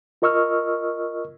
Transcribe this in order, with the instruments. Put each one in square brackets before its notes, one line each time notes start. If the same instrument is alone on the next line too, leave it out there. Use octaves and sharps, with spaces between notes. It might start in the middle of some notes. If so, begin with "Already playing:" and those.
[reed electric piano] F4 A#4 D#5 C#6 E6 F6